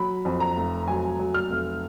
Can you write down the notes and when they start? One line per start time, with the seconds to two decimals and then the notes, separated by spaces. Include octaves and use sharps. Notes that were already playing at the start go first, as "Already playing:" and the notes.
Already playing: F#3 B5
0.25 F2
0.40 A#5
0.57 F1
0.88 F#3 G#5
1.19 F#3
1.34 F6
1.50 F1